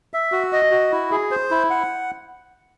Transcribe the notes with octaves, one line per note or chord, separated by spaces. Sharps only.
E5
F#4
D#5
F#4
E4
G#4
C5
E4
F#5